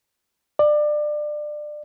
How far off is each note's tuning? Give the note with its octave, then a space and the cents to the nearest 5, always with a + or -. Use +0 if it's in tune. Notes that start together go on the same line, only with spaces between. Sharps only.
D5 +25